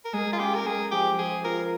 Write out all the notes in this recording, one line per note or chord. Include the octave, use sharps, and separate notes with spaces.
A#4
G#3 G#4
F4
C#4 G4
A#4
G#3 G#4
F3 G4
F3 G#4
F4 A#4